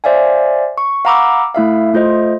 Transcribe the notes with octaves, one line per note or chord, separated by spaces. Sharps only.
C5 D5 E5 F5 G#5
C#6
F5 F#5 A#5 B5 D6 E6
A3 E4 E5 F5
A3 F4 C5 D#5